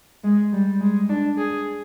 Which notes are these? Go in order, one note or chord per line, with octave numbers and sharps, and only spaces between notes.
G#3
G3
G#3
D4
G#4